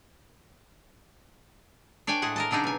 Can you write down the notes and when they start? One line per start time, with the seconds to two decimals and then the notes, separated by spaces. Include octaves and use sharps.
2.07 D4 C#5 D5 G5 G#5
2.22 A2 G#3 G#4 F#5
2.36 A#4 D#5 A5
2.51 C#3 F#3 D4 D#4 G#4
2.64 B2 G#5